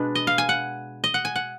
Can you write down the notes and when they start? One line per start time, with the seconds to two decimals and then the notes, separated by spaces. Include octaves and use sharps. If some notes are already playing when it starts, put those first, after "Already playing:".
Already playing: B2 G#3 D4 B4
0.15 D#5
0.27 F5
0.38 G#5
0.49 F#5
1.04 D#5
1.14 F#5
1.25 G#5
1.36 F#5